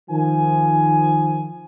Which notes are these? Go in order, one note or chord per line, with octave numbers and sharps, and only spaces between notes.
D#3 F3 G#5